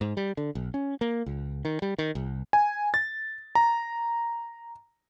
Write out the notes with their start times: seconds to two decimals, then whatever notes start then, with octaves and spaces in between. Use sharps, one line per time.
0.01 G#2
0.17 G3
0.37 D3
0.55 B1
0.74 C#4
1.01 A#3
1.26 C#2
1.65 D#3
1.82 G3
1.98 D#3
2.15 C2
2.53 G#5
2.94 A6
3.55 A#5